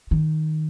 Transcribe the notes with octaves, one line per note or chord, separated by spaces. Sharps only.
D#3